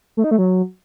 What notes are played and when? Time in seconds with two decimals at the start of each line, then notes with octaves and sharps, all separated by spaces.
0.17 A3
0.24 D#4
0.31 A3
0.38 F#3